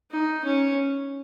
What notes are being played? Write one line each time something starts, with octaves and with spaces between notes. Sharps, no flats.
D#4
C#4